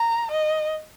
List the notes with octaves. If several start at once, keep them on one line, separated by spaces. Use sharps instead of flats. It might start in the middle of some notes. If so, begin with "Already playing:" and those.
Already playing: A#5
D#5